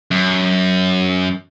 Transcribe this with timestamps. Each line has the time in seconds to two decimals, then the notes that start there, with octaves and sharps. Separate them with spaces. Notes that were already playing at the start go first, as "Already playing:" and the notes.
0.11 F#2